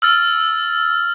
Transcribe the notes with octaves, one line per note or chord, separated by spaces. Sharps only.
E6 F6 A6